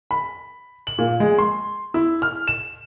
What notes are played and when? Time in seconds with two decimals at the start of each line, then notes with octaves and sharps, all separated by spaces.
0.11 B5
0.87 F#7
0.98 A#2
1.20 G#3
1.38 C6
1.94 E4
2.22 F6
2.47 E7